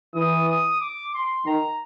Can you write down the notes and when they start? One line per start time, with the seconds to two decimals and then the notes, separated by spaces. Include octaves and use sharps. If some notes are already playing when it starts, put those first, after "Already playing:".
0.15 E3 D#6
0.48 D#6
0.81 D6
1.14 C6
1.46 D#3 A#5